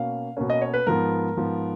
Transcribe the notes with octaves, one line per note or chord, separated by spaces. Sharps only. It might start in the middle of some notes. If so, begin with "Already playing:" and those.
Already playing: B2 A#3 C#4 F5
B2 A#3 C#4
D#5
C#5
B4
G#2 F3 B3 A#4
G#2 F3 B3